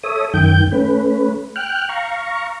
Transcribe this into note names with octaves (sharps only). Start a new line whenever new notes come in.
A4 C#5 E5 D#6
F#2 D#3 G5 G6
A3 C#4 B4
G5 F6 F#6
F5 A#5 C#6